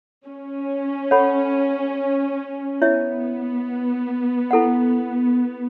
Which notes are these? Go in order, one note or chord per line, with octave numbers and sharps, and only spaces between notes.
C#4
A4 C#5 F#5 B5
B3 E4 C#5 E5
E4 A4 F#5